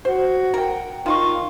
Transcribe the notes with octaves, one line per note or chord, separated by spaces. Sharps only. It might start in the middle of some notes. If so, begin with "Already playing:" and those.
F#4 C5
A#4 G5
D#3 D#4 F4 C#6